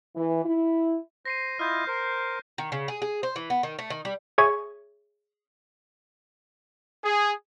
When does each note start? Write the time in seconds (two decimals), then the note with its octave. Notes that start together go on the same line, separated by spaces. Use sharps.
0.15 E3
0.44 E4
1.25 C5 A#6 C7 D#7
1.59 E4 F4 D#5 F6 G6
1.87 A#4 C5 G6
2.58 D#3
2.72 C#3
2.88 G#4
3.02 G#4
3.23 C5
3.36 E3
3.50 B3
3.63 D#3
3.79 A3
3.90 D#3
4.05 G3
4.38 G#4 C#5 E5 G#5 C#6 G#6
7.04 G#4